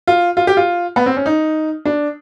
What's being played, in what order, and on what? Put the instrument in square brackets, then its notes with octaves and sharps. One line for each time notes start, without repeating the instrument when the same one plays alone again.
[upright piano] F4
F4
G4
F4
B3
C4
C#4
D#4
D4